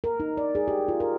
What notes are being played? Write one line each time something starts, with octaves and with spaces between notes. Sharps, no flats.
A#4
D#4
D5
G#4
G4
F4
A#4